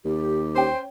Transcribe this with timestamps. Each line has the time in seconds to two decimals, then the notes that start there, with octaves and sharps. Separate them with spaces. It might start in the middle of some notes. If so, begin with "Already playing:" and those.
0.05 D#2 G4
0.55 C#4 C5 G5